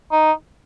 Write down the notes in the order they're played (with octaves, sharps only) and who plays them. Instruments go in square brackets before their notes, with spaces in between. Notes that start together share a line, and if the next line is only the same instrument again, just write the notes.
[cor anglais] D#4